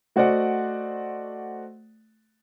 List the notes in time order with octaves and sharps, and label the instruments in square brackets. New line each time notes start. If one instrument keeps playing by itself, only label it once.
[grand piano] A3 F#4 C5 D5 D#5 F#5